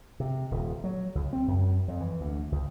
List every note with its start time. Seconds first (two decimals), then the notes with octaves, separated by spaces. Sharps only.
0.20 C3
0.51 D#1
0.84 F#3
1.15 C#2
1.33 C4
1.48 F#2
1.88 F2
2.01 E3
2.21 D2
2.52 C#2